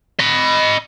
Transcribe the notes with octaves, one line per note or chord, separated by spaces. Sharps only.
D#5 B5